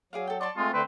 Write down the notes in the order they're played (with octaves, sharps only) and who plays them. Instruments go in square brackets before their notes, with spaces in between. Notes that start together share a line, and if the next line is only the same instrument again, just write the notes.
[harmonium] F#3 [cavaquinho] G#4 D5 F5
[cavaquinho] A4 G5
[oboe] D5 [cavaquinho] A5 C6 C#6
[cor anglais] G#3 [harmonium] A3 C4 [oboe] F4
[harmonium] D3 A3 D4 [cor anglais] C4 [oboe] B4